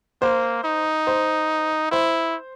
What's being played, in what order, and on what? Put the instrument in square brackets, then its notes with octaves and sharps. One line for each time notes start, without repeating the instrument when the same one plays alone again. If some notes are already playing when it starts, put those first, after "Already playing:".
[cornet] A#3 [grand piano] C5
[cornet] D#4
[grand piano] C5
[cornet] E4 [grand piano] C5